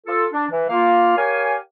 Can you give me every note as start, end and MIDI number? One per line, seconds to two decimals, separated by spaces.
0.06 0.26 65
0.06 0.26 69
0.32 0.45 62
0.50 0.66 52
0.69 1.15 58
0.69 1.15 65
0.69 1.15 77
1.17 1.56 67
1.17 1.56 70
1.17 1.56 73
1.17 1.56 77
1.17 1.56 80